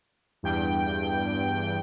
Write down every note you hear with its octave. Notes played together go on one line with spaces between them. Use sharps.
E2 G2 G5